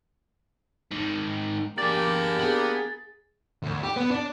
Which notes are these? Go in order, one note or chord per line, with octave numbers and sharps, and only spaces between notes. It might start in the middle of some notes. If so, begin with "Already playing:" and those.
G#2 D#3
A#3 D4 G4 G#4 D5 A6
B3 G#4
D2
G4
B3
D4